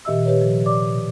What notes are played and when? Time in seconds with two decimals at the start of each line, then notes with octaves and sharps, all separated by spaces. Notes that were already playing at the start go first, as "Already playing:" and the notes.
0.05 A#2 D#3 G4 D#5 E5 E6
0.25 G4 B4 C#5
0.41 C3 F3
0.65 D5 D6
0.92 B2